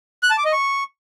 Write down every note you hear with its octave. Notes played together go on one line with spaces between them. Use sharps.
F#6
A5
D6
D#5
C#6